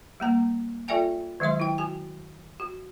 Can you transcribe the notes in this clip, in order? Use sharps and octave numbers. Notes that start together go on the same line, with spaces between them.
G3 A#3 A#5
F4 A4 D5 E5 G5 G#5
D#3 F#3 G#3 D#5 C6
E4 G5
F#4 G#5
F#4